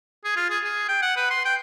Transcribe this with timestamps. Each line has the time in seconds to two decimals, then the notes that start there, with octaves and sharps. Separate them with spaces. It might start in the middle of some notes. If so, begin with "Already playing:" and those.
0.24 G#4
0.36 F4
0.50 G#4
0.64 G#4
0.89 G5
1.02 F#5
1.17 B4
1.31 C6
1.45 G5